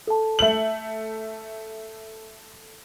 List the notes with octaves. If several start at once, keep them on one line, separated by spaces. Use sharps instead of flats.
A4 A5
A3 F#7